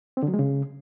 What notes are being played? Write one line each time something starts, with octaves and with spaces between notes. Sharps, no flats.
C4
D3
F#3
G#3
C#3